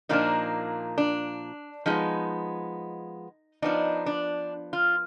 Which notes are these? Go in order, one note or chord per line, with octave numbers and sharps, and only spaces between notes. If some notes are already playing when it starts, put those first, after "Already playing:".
A#2 F3 A#3 D4 D#4
D4
F3 G#3 B3 D#4
F3 B3 D4 D#4
D4
F4